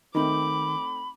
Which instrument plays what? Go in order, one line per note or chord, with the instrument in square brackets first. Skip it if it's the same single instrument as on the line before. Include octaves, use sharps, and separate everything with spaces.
[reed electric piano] D#3 [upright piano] A3 C4 D#4 [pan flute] B5 [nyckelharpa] D6